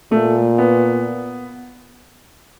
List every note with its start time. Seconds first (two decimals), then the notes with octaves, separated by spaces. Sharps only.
0.12 A#2 A3
0.58 B3